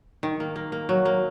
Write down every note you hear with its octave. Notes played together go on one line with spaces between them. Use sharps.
D#3
A#3
A#3
A#3
F#3
A#3